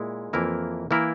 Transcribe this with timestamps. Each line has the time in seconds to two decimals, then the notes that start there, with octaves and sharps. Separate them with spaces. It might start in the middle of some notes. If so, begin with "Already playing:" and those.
Already playing: A#2 G#3 E4
0.33 F2 E3 A#3 E4 A#4
0.91 E3 A#3 E4 A#4